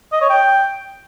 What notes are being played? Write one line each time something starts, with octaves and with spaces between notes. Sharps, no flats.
D#5
C#5
G5